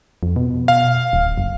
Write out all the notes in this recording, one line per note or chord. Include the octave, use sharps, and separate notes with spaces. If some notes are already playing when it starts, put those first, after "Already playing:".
F2
B2
F5
D1
F#1